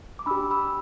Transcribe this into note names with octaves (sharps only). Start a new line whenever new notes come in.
D6
D4 G4 B5 E6
B5 E6